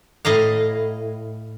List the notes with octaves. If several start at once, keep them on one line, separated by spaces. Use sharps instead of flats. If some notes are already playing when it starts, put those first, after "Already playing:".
A2 D#5 F5 A#5